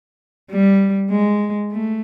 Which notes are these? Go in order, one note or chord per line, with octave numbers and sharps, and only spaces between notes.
G3
G#3
A3